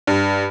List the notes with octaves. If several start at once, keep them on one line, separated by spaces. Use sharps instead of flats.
G2